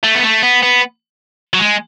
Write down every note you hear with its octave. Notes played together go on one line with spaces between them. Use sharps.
A3
B3
A3
B3
B3
F#3
G#3